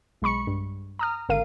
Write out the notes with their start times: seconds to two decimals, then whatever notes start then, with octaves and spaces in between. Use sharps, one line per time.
0.22 B1 G#3 B5 C#6 C#7
0.47 G2
0.99 A#5 D#6 F6
1.29 G#1 D3 A#4 F5 D#7